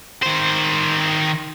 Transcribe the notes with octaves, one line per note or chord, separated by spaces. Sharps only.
D#3 C5